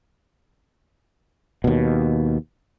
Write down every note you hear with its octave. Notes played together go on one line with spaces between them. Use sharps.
D#2 B2